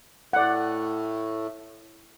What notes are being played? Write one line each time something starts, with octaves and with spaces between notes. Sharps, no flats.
A2 A3 D5 F#5